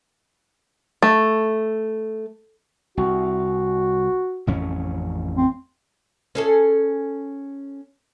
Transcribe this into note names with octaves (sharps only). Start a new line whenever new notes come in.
A3
C2 F#4
A1 F2 C#4
C4
C#4 G#4 A4